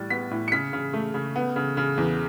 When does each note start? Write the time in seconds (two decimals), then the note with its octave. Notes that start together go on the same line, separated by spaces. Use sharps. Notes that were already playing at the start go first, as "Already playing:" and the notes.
Already playing: A2 G3 A6
0.10 B3 B6
0.31 A2
0.48 C#7
0.52 C#3 B6
0.73 C#3
0.94 A3
1.14 C#3
1.36 B3
1.56 C#3
1.77 C#3
1.97 E2